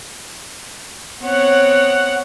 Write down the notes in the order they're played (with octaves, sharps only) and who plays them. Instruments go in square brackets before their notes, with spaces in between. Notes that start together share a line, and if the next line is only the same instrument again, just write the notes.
[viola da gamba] B3 C4 C#5 [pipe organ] F#5